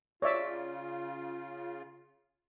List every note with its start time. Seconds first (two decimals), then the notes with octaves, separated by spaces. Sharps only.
0.22 C#3 F4 C#5 D5 E5